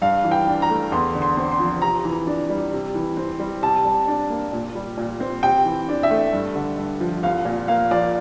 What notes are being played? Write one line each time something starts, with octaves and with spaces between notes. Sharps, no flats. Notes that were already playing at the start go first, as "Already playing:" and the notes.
G2 F5
E3
G5
D4
A#5
A3
E2 C6
D3
C6
C4
C6
F3
C3 A#5
E3
D4
G3
C3
E3
C4
G3
C3 A5
G3
D4
A#3
A#2
G3
A#2
C4
C3 G5
E3
D4
E5
A3
G2
D3
G2
F3
C2 F5
A#2
A#3 F5
F3 D5